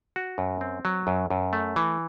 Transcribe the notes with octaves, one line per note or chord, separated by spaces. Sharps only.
F#4
F#2
C4
F#3
F#2
F#2
A3
E3